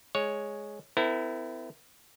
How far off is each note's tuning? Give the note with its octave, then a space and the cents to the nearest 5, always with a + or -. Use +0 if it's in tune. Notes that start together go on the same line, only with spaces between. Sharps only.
G#3 +0 C#5 +0
C4 -45 E4 +0 A#4 -40